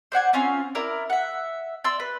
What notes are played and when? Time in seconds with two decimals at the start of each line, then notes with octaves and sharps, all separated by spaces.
0.12 C5 D5 F#5 G#5
0.33 C4 C#4 F4 G#5
0.75 E4 A#4 D5
1.10 E5 F#5
1.84 D5 C6 E6
2.00 B4